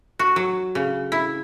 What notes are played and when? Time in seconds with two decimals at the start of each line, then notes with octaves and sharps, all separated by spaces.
0.19 F#4
0.36 F#3
0.75 C#3
1.12 E4